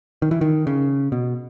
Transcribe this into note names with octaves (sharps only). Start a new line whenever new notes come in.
D#3
E3
D#3
C#3
B2